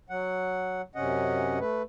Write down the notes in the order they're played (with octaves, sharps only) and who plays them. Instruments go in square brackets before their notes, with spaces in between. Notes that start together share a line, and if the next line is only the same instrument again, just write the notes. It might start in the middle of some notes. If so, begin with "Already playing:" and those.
[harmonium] F#3 F#5
F#2 C3 C#4 D#5 F#5
A3 B4